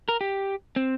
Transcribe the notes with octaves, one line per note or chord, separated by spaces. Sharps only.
A#4
G4
C4